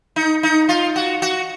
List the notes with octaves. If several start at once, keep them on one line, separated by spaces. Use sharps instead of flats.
D#4
D#4
F4
F#4
F#4